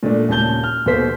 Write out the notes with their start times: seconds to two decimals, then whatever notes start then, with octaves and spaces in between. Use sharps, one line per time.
0.03 A#2 A3 D4
0.29 D#2 A#2 C#3 A5 G6 G7
0.63 F6
0.86 D#2 B2 A4 C5 B6